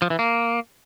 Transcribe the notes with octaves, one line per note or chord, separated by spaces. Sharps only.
F3
E3
A#3